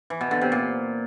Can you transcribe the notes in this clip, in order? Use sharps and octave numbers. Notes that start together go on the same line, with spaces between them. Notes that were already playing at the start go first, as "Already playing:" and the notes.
E3
B2
D3
C3
A#2